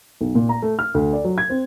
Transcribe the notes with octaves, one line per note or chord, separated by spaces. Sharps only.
B1
A#2
A#5
A3
F6
D2
D5
F#3
G#6
C4